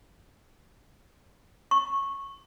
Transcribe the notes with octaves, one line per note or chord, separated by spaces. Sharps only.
C#6